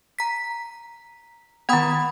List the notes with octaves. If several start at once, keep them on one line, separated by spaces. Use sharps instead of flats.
A#5 B6
D#3 B3 F#5 B5 D#6